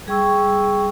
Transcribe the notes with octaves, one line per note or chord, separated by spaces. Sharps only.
G3 G#4 G5 C#6 E6